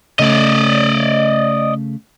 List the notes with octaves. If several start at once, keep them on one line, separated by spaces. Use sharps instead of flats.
C#3 A3 D5 D#5